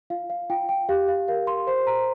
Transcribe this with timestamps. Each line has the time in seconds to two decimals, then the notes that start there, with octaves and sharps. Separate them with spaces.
0.10 F4 F5
0.30 F5
0.50 F4 G5
0.69 G5
0.89 G4 F5
1.08 F5
1.28 A#4 F5
1.47 C6
1.67 C5 C6
1.87 A#5